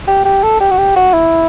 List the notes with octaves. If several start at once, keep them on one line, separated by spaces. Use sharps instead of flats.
G4
G4
A4
G4
F#4
G4
F#4
E4